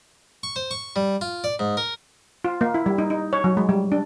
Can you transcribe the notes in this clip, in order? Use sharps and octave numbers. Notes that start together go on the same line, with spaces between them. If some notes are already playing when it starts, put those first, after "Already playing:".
C#6
C5
C#6
G3
F4
D5
G#2
A#4
F4
A#3
E4
G3
D#4
D#4
C#5
F#3
G#3
G3
D4